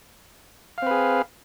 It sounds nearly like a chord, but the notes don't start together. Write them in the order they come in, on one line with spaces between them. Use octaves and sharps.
F5 C4 B4 G#4